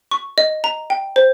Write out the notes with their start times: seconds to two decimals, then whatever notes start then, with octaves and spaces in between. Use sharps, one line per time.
0.11 C#6
0.38 D#5
0.64 A#5
0.90 G5
1.16 C5